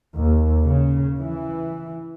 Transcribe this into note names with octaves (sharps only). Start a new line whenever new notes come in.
D#2
C#3
E3